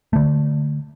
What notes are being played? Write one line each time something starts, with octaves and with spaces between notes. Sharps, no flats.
D3 A3